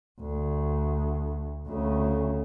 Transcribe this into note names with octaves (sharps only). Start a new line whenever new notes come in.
D2
D2 C#3